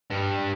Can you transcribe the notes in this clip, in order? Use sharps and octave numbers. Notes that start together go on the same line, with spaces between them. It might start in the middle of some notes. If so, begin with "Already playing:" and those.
G2